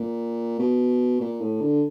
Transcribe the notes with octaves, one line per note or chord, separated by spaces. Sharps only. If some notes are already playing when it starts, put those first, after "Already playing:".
Already playing: A#2
B2
A#2
A2
D3